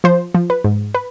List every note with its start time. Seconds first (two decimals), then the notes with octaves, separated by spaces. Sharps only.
0.04 F3 C5
0.35 F3
0.50 B4
0.64 G#2
0.95 B4